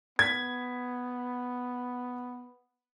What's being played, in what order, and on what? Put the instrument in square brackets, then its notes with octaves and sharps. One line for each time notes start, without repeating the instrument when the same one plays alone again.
[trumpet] B3 [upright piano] G#6 B6